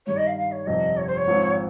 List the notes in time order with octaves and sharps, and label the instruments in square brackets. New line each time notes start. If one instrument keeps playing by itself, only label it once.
[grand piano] G2 D#3 G3 [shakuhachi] C#5
[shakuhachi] D#5
F5
F5
C#5
[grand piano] G1 F2 C3 G3 C4 [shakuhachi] D#5
[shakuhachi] C#5
C5
C#5
[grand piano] G#1 G#2 F3 C4